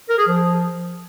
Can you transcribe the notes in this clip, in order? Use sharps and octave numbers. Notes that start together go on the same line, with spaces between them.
A#4
G#4
F3